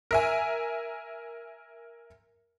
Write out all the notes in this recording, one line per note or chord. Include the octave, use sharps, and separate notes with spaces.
A#4 E5 G#5